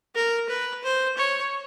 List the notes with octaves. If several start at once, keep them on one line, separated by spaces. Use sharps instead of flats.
A#4
B4
C5
C#5